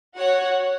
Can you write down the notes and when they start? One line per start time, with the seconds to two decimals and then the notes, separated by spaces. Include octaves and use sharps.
0.15 F#4 C#5 F#5